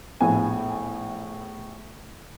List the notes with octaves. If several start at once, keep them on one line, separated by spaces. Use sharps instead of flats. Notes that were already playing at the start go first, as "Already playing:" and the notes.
A#1 A2 B3 G#5